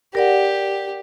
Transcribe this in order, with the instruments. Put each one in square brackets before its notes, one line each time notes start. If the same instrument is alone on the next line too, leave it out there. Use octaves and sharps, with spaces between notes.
[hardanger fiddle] G4 [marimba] A#4 D5 F#5